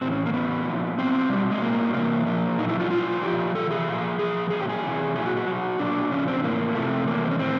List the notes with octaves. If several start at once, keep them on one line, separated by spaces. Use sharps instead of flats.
A2 E3 C4
C#4
A#3
A2 E3 B3
A#2 F3
B2 F#3 C4
B2 F#3 G3
G#3
A2 F#3 A#3
C3 E3 A#3
A#2 F3 A#3
A#2 F#3 D#4
E4
F4
B2 F#3 F4
A#2 F3 G4
C3 E3 A4
G#4
A#2 F3
A#2 F3 G#4
A#2 F#3 G#4
G4
G#4
C3 E3
A#2 F#3 G#4
F#4
F#4
B2 F#3
A#2 F#3 D4
C#3 F3 C#4
C4
A2 E3 A#3
C3 F3 A3
C3 E3 A#3
C4
C#4
A2 C4